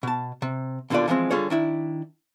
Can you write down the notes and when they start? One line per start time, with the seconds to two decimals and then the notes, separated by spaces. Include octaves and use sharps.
0.03 B2 A5
0.42 C3
0.90 D#2 B2 D3 A#3 F4 D5
1.08 E3 F3 G#3 B3 C4
1.31 D3 G3 F4 G#4 C#5
1.50 D#3 D4 E4